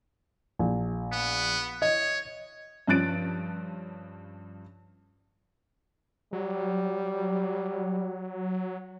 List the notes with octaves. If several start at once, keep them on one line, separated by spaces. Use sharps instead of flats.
A#1
B3
C#5 D#5
G2 F3 C#4 F#6 A6 D7
F#3 G3